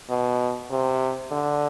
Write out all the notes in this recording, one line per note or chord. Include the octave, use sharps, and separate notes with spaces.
B2
C3
D3